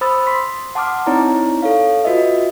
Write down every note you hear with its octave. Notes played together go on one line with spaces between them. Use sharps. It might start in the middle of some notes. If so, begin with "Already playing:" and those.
C5 B5 D#6 E6 A6
C6 B6
F#5 A5 C6 D6 D#6 F6
C4 D#4 E4 C#5 D5 A#5
A4 C#5 F5
F4 F#4 B4 D#5 E5